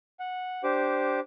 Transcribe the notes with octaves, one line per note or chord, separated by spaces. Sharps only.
F#5
D4 G4 C5 D6